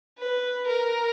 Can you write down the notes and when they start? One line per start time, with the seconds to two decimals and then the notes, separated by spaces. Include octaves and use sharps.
0.18 B4
0.68 A#4